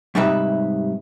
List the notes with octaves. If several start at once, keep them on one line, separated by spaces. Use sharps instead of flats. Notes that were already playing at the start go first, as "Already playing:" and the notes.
G#2 C3 G3 D#4 B4 E5